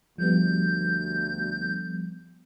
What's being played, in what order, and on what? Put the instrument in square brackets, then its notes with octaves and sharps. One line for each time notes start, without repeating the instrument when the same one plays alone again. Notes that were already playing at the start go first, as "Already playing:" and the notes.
[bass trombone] D2 [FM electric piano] F3 G3 B3 [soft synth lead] G6